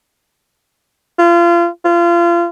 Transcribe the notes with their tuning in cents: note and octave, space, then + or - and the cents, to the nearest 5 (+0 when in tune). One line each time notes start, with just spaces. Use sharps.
F4 -30
F4 -30